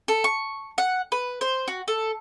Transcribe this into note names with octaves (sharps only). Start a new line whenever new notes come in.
A4
C#6
F#5
B4
C5
F#4
A4